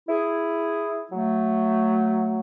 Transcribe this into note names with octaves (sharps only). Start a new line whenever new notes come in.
E4 G#4
F#3 A3